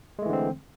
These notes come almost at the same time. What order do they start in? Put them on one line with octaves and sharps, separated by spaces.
G#3 A3 E3 D3 C4